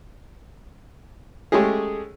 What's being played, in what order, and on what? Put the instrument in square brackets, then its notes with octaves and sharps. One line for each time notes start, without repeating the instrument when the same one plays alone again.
[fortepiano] G#3 A3 C#4 G4 G#4